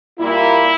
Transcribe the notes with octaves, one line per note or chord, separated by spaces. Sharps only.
A#2 G3 A#3 E4